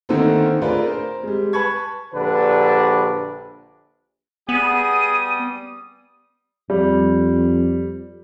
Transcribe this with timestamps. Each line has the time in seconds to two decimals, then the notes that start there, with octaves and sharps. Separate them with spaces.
0.09 D3 D#3 A3 A#3 C4 A4
0.62 A3 D4 F4 G#4 A#4 B4
0.84 A#4 C5
1.23 G3 G#3
1.53 B4 A5 B5 C#6 G#6
2.14 A#1 D3 D4 G4 B4
4.49 G3 B3 G#4 D#6 D#7
6.70 F2 G3